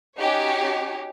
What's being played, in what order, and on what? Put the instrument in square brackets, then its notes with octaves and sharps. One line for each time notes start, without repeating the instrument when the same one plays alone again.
[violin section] C#4 D#4 F#4 G4 C#5